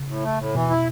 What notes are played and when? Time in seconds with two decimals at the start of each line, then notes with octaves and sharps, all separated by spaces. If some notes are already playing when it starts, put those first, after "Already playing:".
Already playing: C#3
0.08 A2
0.23 A3
0.39 A2
0.54 B2 E3
0.70 E4